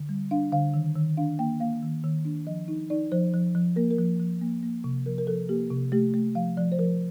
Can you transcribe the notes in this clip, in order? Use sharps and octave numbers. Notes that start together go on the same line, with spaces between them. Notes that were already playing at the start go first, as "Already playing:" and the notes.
Already playing: D3
G3
D4 F5
D3 F5
D#3
D#3
D4 F5
A#3 G5
A#3 F5
D#3
D#3
D4
F3 D#5
D#4
D#4 D5
F3 C5
F3
F3
A#3 A#4
A#4
F3
F3
A#3
A#3
C3
F3 A#4
A#4
F3 A4
A#3 G4
C3
A3 G4
A3
F3 F5
F3 D5
C5
F3 A#4